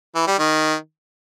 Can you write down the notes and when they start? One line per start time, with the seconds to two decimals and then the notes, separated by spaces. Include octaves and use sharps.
0.15 E3
0.27 G3
0.39 D#3